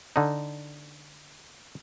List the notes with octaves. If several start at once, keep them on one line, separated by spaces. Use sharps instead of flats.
D3 D#4